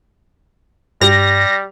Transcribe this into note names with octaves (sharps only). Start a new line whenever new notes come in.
G2 G3 G4 A#6 F7